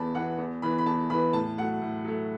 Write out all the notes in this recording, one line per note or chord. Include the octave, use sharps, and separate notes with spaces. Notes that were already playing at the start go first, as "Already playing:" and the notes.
Already playing: E2 E3 B3 A5 B5
E3 B3 F#5
E2
E3 B3 B5
B5
E2 A5
E3 B3 B5
A2 A5
F#3 A3 F#5
A2
F#3 A3